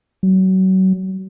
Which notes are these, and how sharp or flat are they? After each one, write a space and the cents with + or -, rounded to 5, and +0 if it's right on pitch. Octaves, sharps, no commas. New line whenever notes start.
F#3 +30